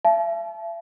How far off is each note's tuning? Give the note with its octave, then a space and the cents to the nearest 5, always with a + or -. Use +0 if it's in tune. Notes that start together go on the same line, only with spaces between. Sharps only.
E5 +45 A5 -35